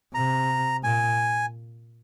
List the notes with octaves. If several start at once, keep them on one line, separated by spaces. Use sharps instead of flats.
C3 A#5
A#2 G#5